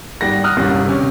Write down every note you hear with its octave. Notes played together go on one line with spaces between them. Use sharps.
G#1 G3 F#5 A#6
D#6 F6 F#6
D#1 C2 G2 C#4
C3 C#4